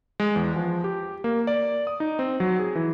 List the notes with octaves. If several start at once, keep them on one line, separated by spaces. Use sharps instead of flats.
G#3
E2
F3
G4
A#3
D5
D#6
D#4
C4
F#3
G#4
E3